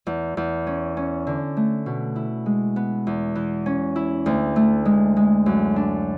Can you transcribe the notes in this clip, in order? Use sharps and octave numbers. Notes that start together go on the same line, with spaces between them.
E2
E2
C#4
C#4
D3
A3
B2
E4
G#3
B3
E2
E3
C#4
E4
D2
A3
G#3
G#3
F#2
D4